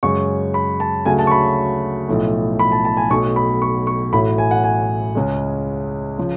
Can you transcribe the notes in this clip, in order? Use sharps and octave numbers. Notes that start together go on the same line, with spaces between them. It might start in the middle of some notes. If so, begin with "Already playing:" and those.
F#2 C#3 G#3 C#6
B5
A5
D2 C#3 F#3 A3 G#5
A5
C#6
B5
B1 A2 F3 A3
B5
A5
A5
G#5
B1 B2 F#3 A3 C#6
B5
C#6
C#6
A1 A2 F#3 A3 B5
G#5
F#5
G#5
C#2 C#3 G#3
C#3 F3